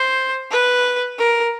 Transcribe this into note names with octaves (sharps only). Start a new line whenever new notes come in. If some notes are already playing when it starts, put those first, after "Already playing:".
Already playing: C5
B4
A#4